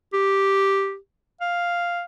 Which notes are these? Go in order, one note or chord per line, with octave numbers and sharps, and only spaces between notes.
G4
F5